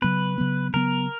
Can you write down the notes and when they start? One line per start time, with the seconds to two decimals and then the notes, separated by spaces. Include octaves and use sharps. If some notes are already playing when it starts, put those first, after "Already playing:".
0.02 C#3 F#3 B3 B4
0.38 C#3 F#3 B3
0.74 C#3 F#3 B3 A#4